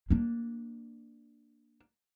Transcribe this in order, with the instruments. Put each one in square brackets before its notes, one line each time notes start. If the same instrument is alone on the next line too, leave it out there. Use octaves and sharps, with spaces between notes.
[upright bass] A#3 D4